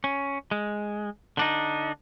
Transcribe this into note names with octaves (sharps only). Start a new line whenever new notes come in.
C#4
G#3
D3 D4 D#4